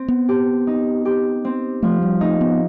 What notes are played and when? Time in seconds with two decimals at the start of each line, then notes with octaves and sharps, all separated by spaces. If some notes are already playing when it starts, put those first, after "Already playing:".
Already playing: C4
0.08 B3
0.29 G4
0.67 D#4
1.05 G4
1.45 C4
1.83 F3 A3
2.02 G3
2.21 A3 D#4
2.41 B3